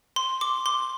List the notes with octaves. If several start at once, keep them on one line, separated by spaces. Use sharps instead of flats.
C6
D6
C6